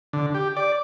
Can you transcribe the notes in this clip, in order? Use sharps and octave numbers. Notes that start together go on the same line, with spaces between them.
D3
G4
D5